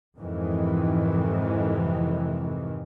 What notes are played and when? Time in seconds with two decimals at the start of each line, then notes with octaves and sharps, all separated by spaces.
0.20 F2 G#2 C3 D#3 E3